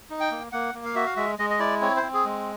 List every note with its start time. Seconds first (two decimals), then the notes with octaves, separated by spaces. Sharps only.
0.10 D#4
0.20 G5
0.31 A#3
0.52 A#3 F#5
0.74 A#3
0.85 F5
0.95 F#4 E5
1.06 F5
1.16 G#3 E5
1.39 G#3 D#5
1.50 D#5
1.59 E4 D5
1.81 C4 C#5
1.97 C5
2.03 C4
2.14 G#4
2.25 G#3